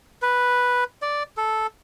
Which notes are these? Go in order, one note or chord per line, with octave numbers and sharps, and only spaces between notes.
B4
D5
A4